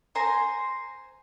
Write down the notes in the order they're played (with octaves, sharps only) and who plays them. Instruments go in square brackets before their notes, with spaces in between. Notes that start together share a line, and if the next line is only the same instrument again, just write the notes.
[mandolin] C5 G#5 A#5 C6